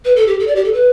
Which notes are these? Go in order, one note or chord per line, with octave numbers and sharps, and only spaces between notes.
B4
A4
G4
A4
D5
G4
A4
B4